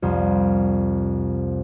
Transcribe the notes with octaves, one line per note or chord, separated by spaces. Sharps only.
C2 F2